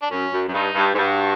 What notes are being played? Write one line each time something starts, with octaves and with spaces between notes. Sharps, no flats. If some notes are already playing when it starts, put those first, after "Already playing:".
D4
F#2 C#4
F#2
F#2
G2 D#4
G2
G#2
G2 F#4